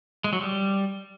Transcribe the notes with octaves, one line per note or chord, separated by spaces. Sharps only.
G#3
F#3
G3